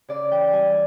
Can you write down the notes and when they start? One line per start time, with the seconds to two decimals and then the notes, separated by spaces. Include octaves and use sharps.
0.08 C#3 D5
0.30 E3 G5
0.52 G3 G#5